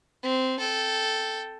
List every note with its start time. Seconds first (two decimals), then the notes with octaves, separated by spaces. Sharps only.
0.23 C4
0.59 A4 G5